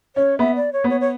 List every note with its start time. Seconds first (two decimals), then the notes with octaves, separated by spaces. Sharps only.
0.16 C#4 C#5
0.39 B3 E5
0.56 D5
0.73 C#5
0.84 B3
0.90 C#5
1.01 C#5